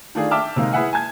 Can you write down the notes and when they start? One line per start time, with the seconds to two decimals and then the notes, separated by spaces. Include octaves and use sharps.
0.15 D#3 A3 D4 F4 G#4
0.31 E5 G5 A5 D6 E6 F6
0.56 C3 D#3 G#3 A#3 C4 D#4
0.73 E4 G#4 B4 E5 F#5 G#5
0.93 G#5 A5 G#6